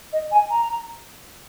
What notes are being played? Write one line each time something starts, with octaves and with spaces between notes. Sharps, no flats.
D#5
G#5
A#5